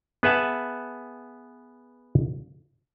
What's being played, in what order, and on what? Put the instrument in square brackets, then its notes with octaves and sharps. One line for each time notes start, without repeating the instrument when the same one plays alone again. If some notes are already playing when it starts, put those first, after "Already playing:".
[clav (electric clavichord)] B3 G#4 B4 E5 F#5 A5